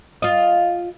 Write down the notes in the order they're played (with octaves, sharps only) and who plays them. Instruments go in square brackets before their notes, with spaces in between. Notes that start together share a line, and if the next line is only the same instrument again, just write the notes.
[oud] F4 D#5